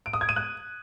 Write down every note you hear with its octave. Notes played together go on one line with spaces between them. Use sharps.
D7
D#6
G#6
D#7
F#6